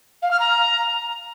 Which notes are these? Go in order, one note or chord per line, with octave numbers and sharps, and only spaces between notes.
F5
F6
A#5